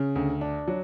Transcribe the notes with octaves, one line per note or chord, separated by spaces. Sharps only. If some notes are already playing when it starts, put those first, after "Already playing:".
Already playing: C#3
D2
D4
F#3